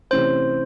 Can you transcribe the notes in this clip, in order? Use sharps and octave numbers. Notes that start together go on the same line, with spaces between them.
C3 E3 A3 C#4 C5